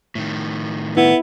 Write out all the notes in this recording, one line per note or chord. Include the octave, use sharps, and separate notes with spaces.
A2 D#3
B3 E4